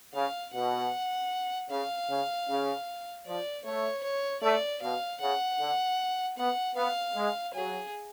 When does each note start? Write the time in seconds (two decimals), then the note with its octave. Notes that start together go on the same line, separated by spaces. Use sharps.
0.14 C#3 F5
0.53 B2 F#5
1.70 C#3 F5
2.09 C#3
2.48 C#3
3.26 F3 D5
3.64 A3 C#5
4.03 C#5
4.42 A3 D5
4.81 B2 F5
5.20 C#3 F#5
5.60 D3
6.37 B3 F#5
6.76 B3 F5
7.15 G#3
7.54 F#3 G#4